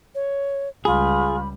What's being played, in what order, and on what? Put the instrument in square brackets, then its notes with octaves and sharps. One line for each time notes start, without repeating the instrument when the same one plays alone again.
[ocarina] C#5
[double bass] C#2 G3 [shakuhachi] F4 [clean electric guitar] G#4 [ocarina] B5